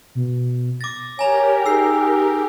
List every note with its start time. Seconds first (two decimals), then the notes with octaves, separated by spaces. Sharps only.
0.15 B2
0.81 D6 A6 A#6
1.19 G4 A#4 C#5 G#5 A#5 F7
1.66 D#4 G#4 E6 C7